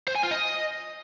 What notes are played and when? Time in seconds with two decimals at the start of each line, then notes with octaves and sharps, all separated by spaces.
0.08 C5
0.15 G#5
0.23 F4
0.31 D#5